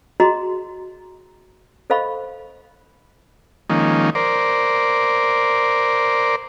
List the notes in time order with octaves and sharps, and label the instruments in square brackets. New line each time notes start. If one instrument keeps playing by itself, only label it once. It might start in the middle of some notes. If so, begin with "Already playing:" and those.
[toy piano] F#4 G#4 D#5 A#5 C6
A4 C5 D#5 F5 B5 C#6
[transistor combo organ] D#3 F3 G#3 A#3 C#4 D#4
A#4 C5 D5